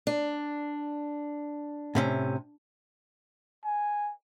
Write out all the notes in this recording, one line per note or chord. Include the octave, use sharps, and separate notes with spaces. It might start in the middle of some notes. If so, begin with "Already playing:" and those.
D4
A2 C3 C#4
G#5